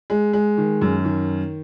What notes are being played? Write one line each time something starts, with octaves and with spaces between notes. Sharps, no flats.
G#3
G#3
D#3
F#2
D#3